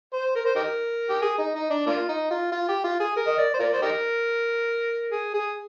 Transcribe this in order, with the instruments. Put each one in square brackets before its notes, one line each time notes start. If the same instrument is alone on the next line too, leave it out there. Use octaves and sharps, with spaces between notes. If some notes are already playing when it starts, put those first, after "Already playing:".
[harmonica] C5
A#4
C5
D#4 G4 A#4
G4
G#4
D#4
D#4
D4
A#3 D4 F4
D#4
F4
F4
G4
F4
G#4
A#4
D#5
D5
C5
F4 A#4 D5
C5
D#4 G4 A#4
G#4
G#4